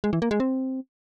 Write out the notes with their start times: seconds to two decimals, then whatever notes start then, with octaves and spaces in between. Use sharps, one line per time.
0.04 G#3
0.13 E3
0.22 A#3
0.31 G#3
0.40 C4